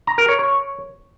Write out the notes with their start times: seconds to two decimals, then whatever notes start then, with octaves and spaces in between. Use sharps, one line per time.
0.07 A#5
0.18 A#4
0.29 C#5
0.39 C#5